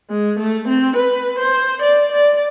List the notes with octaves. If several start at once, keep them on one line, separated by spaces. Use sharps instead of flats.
G#3
A3
C4
B4
C5
D5
D5